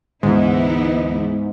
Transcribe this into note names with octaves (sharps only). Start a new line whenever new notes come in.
D2 G#2 E3 B3 D#4 E4